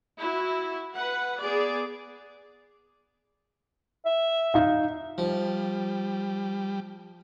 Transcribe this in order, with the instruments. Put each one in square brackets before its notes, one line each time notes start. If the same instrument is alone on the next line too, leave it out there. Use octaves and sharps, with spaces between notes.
[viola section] E4 F#4
B4 F#5
B3 G#4 D5
[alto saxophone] E5
[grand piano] D#4 F5
[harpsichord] F3 [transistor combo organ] G3